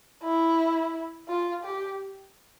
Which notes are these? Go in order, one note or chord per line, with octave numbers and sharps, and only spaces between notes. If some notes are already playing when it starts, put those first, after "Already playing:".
E4
F4
G4